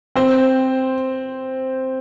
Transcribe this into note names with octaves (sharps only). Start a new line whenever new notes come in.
C4 C5